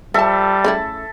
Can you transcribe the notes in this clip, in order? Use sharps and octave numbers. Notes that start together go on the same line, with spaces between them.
F3 G3 A4 E5 A5
C#3 A3 E4